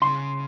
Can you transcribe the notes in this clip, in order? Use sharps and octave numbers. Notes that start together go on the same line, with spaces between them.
C#3 C6